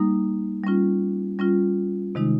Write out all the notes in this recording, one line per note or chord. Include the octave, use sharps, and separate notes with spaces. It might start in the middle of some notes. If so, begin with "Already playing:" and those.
Already playing: G3 A#3 D#4
G3 C#4 F4
G3 C#4 F4
C3 D#3 G#3 D#4